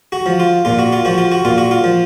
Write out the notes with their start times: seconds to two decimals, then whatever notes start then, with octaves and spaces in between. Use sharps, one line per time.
0.12 F#4
0.26 F3
0.40 F4
0.65 A#2 F4
0.79 F#4
0.92 F4
1.05 F3 F#4
1.18 F4
1.32 F#4
1.45 A#2 F4
1.58 F#4
1.71 F4
1.84 F3